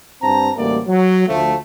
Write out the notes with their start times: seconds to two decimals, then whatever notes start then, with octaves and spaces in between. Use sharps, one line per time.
0.23 G2 C4 A5 A#5
0.57 A1 D2 G3 A#3 D5
0.87 F#3
1.28 D2 F3 A3